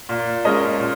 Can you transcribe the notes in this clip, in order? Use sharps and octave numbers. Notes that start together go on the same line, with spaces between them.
A#2
G#3 C#4 A#4 D#5
A#2